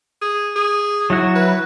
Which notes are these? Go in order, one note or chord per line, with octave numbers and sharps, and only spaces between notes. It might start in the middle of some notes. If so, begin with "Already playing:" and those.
G#4
G#4
F#3 E4 F#4
B4